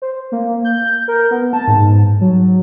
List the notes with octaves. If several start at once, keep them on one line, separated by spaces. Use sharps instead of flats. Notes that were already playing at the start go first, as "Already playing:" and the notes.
C5
A#3
G6
A#4
B3
A5
G#2
F#3